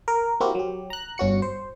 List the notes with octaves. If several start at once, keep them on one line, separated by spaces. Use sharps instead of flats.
A#4
A#3 C4 E4 F#4 G4 A#4
F#3 G4
A#5 F#6
G1 C#4 F#4 C#7
C5